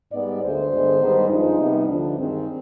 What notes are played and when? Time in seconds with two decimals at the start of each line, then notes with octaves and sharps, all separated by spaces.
0.12 G#2 G3 B3 D5
0.42 D2 D3 G#3 C5
0.72 G2 D3 G#3 B3
1.01 G#2 D#3 G3 B3
1.30 G2 F3 G#3 D#4
1.59 C3 G3 B3
1.89 D2 D3 F3 D4
2.18 G2 D#3 G#3 C4